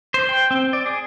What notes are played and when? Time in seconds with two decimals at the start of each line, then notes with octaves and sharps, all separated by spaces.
0.14 C5
0.29 G5
0.51 C4
0.73 D5
0.86 G#4